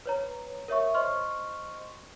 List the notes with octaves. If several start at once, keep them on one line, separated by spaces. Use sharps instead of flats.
B4 C#5 A#5
A#4 C#5 E5 C#6
C5 D#5 C6 C#6 F6